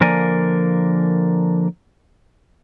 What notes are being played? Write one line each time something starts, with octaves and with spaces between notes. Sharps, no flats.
D3 F3 A#3 A#4 D5 G#5